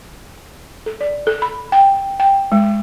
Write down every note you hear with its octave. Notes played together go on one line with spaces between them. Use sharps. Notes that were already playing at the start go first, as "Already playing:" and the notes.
A4
D5
A4
B5
G5
G5
G#3